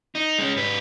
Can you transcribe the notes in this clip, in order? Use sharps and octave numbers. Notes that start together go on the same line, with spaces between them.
D#4
G#3 C#4
G#2 B4